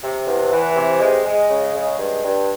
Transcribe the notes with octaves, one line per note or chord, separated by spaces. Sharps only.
C3
E2
E3
C3
G#3
G#3
C#3
G#3
G2
G2